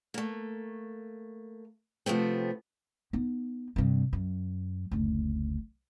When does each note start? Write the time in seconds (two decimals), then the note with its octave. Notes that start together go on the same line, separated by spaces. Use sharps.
0.14 A3 A#3
2.06 C3 F3 A3 B3 C4
3.13 B3 D#4
3.76 G2 C3
4.13 F#2
4.91 F#1 D2